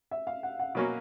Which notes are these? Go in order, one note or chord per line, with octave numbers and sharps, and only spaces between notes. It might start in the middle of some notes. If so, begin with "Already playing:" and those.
E5
F5
F#5
F#5
B2 F#3 A#3 C#4 F#4